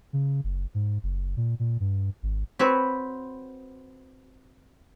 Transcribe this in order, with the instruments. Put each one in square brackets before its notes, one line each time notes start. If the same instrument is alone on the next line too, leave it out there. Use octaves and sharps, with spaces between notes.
[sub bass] C#3
F#1
G#2
F#1
A#2
A#2
G2
G#1
[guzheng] C4 F#4 B4 C#5